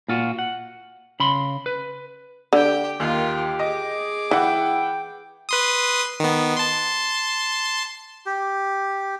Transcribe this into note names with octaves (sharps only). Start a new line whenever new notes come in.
A#2 F4 F#4
F#5
C#3 B5 C6
B4
D3 G4 G5
D#2 F4 G4 A#4
G#4 D#5 D6
E3 E4 F#5 G5
B4 C6 D#6
D#3 B3
A5 C6
G4